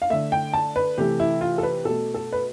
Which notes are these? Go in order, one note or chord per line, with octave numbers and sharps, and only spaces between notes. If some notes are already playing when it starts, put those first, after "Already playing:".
F5
D3 A3 E5
G5
A5
B4
C3 E3 A3 G4
E4
F4
A4
B4
B2 A3 A4
A4
B4